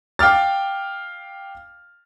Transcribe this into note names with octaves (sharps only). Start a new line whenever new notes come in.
F5 G5 D6 F6 A6